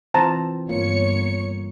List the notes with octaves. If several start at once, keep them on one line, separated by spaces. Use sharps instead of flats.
E3 C4 F4 C5 A5 A#5
G1 A#3 F4 C#5 C#7